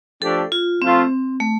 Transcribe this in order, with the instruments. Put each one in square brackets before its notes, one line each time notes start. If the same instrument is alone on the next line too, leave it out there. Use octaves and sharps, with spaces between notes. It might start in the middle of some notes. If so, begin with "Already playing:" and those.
[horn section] F3 A3 D4 G4 D5 [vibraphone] A4
[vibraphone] F4
[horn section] F3 A3 F4 C5 [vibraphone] C4
[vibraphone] A3